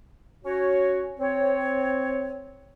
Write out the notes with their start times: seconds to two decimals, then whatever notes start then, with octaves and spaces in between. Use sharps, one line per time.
0.45 C#4 F#4 C#5
1.19 C4 C#5